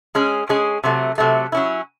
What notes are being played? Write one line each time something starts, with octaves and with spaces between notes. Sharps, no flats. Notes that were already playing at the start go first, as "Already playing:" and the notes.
G#3 C#4 G#4
G#3 C#4 G#4
C3 F#3 A3
C3 F#3 A3
F#3 C#4 E4